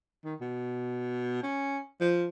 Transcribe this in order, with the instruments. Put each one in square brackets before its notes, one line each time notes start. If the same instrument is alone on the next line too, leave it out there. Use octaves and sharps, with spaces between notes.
[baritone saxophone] D#3
B2
C#4
F3